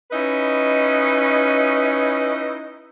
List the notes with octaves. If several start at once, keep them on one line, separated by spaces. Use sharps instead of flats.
C#4 D#4 E4 B4 D#5